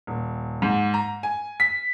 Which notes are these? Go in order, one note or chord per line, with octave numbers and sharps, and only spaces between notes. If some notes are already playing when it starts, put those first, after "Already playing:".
D#1
G#2
A#5
G#5
B6